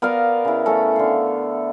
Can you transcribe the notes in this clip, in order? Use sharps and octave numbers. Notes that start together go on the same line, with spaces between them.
B3 A#4 D5 F5
C#3 E4
A3 C#4 A4
D3 F5